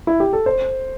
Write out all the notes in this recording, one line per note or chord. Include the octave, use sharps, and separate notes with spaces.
E4
G4
A4
C5